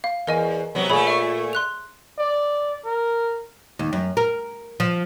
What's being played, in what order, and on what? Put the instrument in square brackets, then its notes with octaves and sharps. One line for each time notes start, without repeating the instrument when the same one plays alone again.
[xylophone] F5
[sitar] E2 [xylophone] A#4 D#5 G#5
[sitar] C3 F#3 B3
[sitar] A#2 A3 [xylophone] G#4 C#5 B5
[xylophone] E5 C#6
C6 F#6 F7
[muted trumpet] D5
A#4
[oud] D#2
F#2
A#4
F3